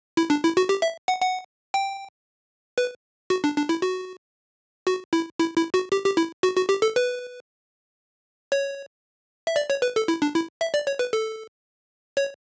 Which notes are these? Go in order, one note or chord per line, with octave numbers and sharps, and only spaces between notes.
E4
D4
E4
F#4
G4
E5
F#5
F#5
G5
B4
F#4
D4
D4
E4
F#4
F#4
E4
E4
E4
F#4
G4
G4
E4
F#4
F#4
G4
A4
B4
C#5
E5
D5
C#5
B4
A4
E4
D4
E4
E5
D5
C#5
B4
A4
C#5